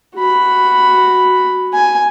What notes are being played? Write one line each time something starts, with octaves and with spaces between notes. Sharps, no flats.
F#4 B5
G#5